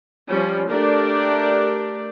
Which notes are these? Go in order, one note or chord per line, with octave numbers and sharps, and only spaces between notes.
F3 G3 C#4
A3 D4 G4 A#4 D5